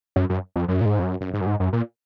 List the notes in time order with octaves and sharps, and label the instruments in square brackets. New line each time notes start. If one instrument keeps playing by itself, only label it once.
[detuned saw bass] F#2
F#2
F2
F#2
A#2
G#2
F2
F#2
F#2
G#2
F#2
G#2
F#2
A#2